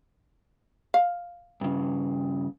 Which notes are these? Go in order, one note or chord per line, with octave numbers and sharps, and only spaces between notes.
F5
G2 C#3